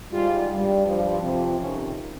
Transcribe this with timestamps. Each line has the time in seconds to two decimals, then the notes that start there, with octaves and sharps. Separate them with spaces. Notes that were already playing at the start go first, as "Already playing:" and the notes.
0.12 G#2 G3 F4
0.49 G2 G3
0.85 G2 F3
1.22 F2 C3 F3
1.57 F2 C3 D#3 C#4